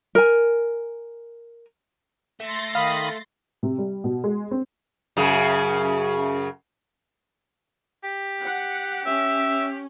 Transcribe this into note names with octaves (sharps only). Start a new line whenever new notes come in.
A#4 G#5
A3 C6 A6 A#6
D#3 F5 B5 D#6
C3
G3
B2
G#3
C4
F#2 C#3 G#4
G4
F#5
C#4 E5